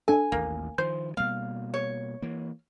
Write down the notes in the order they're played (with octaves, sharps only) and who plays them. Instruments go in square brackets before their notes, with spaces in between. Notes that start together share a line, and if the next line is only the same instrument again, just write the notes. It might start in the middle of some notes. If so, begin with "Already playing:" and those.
[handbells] D4 A4 [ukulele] G#5
[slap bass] A1 D#2 [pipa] A#3
[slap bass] D#3 F3 [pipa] C5 [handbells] G6
[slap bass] B2 G3 A#3 [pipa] F5
[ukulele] C#5
[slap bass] E3 A#3